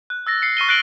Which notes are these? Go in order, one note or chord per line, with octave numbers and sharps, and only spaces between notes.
F#6
E6 A6 A#6
C7 C#7
C#6 F6 D#7 G7
F#6 A#6 C7 D7 F#7 G7